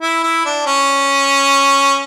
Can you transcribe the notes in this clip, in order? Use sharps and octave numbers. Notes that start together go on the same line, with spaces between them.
E4
E4
D4
C#4